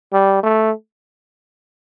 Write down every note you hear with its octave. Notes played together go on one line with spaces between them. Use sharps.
G3
A3